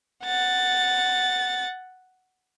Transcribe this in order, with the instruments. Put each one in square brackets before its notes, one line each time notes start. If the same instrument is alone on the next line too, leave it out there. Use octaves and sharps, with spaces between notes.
[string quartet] F#5 A6